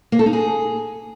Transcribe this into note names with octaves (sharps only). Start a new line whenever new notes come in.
A#3
A4
D#4
G#4